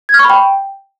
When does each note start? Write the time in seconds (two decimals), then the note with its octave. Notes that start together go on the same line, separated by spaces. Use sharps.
0.09 G#6
0.14 F6
0.19 C#6
0.24 B5
0.30 G5